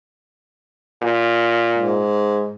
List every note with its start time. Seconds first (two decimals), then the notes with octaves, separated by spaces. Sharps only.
1.02 A#2
1.77 G#2